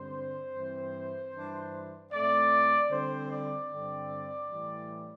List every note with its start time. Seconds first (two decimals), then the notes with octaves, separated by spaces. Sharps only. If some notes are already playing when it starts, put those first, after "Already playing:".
Already playing: G2 D3 C4 C5
0.53 G2 E3 C4
1.32 G2 E3 G3 D4
2.12 A2 A3 C4 D5
2.91 D3 G3 C4 C5
3.31 D5
3.70 G2 D3 C4
4.50 A2 E3 G3